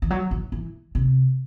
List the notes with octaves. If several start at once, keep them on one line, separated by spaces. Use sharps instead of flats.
E3
F#3
E3
E3
C3